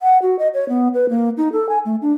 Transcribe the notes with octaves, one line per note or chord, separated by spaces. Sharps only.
F#5
F#4
D#5
C#5
B3
B4
A#3
D#4
A4
G#5
A3
D4